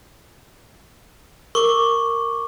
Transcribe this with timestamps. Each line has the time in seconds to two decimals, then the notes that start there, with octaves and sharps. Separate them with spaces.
1.55 A#4 C#6 D6